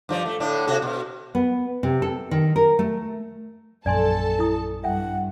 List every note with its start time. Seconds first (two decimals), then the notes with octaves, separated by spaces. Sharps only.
0.09 G2 F3 D5
0.25 A3
0.40 A2 D3 D4
0.67 C3 F#4 A4
0.82 B2
1.35 B3
1.83 C3
2.02 A4
2.31 D#3
2.56 A#4
2.79 A3
3.86 A#1 F#2 A4 D5 G#5 A5 C6
4.39 E4 D#6
4.84 G2 E5 F#5 G5